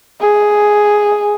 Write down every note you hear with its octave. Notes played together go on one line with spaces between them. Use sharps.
G#4